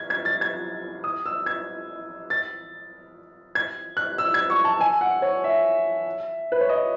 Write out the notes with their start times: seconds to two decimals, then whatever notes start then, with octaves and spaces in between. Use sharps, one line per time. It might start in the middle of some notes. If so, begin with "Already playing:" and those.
Already playing: G#6
0.10 G#6
0.25 A6
0.41 G#6
1.04 D#6
1.26 E6
1.46 G#6
2.30 A6
3.55 G#6
3.97 F#6
4.18 E6
4.34 G#6
4.50 C#6
4.64 A5
4.81 G#5
5.01 F#5
5.22 C#5
5.44 E5
6.52 B4
6.60 C#5
6.69 D#5